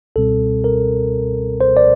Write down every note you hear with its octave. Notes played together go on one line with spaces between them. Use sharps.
C#2 B2 G3 C4 A4
A#4
C5
D5